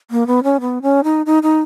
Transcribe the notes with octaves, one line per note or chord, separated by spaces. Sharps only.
A#3
B3
C#4
B3
C#4
D#4
D#4
D#4